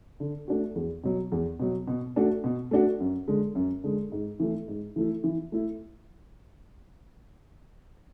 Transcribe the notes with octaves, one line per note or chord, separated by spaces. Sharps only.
D3
A3 D4 F#4
E2
B2 F#3
E2
B2 F#3
B2
A3 D4 F#4
B2
A3 D4 F#4
F#2
D3 G#3
F#2
D3 G#3
G#2
E3 A3 E4
G#2
E3 A3 E4
E3
A3 E4